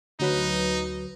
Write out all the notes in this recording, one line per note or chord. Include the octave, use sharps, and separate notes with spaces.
D2 F#3 D#4 B4